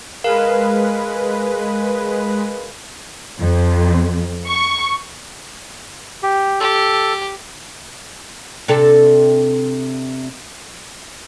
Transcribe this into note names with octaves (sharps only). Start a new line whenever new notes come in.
G#3 A#4 B4 F5
F2
C#6
G4
G4 A4
C3 D4 A4